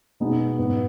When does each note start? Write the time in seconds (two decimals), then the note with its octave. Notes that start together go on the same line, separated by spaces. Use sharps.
0.20 B2 G#3 B3 D#4 G#4
0.58 G#2 F#3 B3 F#4 B4